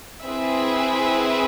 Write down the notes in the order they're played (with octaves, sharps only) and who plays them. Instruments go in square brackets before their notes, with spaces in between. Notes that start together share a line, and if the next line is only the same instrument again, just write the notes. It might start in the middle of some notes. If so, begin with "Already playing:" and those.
[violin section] C4 E4 G#4 B4 E5